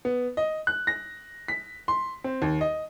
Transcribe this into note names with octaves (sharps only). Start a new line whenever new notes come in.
B3
D#5
F#6
A#6
B6
C6
C4
D#2
D#5